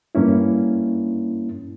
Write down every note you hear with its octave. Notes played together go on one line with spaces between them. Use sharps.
G2 A#3 C#4 E4